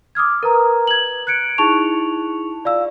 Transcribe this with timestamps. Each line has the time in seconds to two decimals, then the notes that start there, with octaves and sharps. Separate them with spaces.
0.15 D6 D#6 F6 G#6
0.43 A#4 B4 A#5
0.87 G#6 F#7
1.27 F#6 G#6 C#7 D7
1.58 D#4 E4 G#4 A5 C#6 F7
2.64 F4 D5 F5 E6